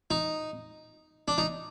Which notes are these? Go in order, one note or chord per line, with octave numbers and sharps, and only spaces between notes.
D#4
D4
D#4